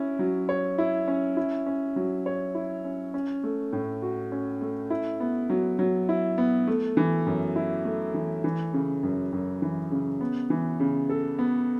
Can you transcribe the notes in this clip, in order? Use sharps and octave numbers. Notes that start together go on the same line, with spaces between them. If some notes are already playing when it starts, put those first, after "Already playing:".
Already playing: C#4 E4
F#3
C#5
E4
C#4
E4
C#4
F#3
C#5
E4
C#4
C#4
A3
A2
F#4
C#4
A3
E4
B3
F#3
F#3
E4
B3
A3
E3
F#2
E4
A3
E3
E3
C#3
F#2
F#2
E3
C#3
B3
E3
C#3
A4
B3